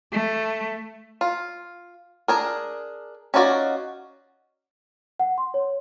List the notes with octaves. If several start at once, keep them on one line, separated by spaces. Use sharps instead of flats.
A3
F4
D4 G#4 A#4
C#4 D#4 F4 F#4 D5
F#5
C6
C#5